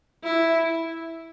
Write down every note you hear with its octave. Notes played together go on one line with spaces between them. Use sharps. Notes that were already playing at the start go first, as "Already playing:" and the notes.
E4